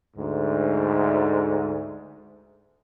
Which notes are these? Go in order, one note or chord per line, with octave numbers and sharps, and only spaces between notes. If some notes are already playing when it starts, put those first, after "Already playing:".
D2 G#2